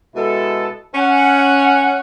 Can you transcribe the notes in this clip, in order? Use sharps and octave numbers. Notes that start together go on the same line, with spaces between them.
B2 G#3 E4 A4
C#4 F#5